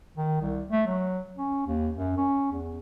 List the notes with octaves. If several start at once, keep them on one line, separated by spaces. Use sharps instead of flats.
D#3
C2
A3
F#3
C#4
D#2
F#2
C#4
E2